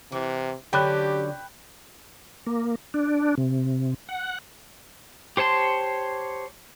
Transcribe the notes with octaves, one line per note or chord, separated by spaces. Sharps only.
C3 E3
D3 F#3 C#4 G4 G5 B5 F#6
A#3
D4
C3
F#5
G4 C5 C#5 A5 C6